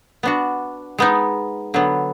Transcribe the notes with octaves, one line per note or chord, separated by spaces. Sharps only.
B3 D4 F#4
G#3 B3 D#4
D3 F#3 B3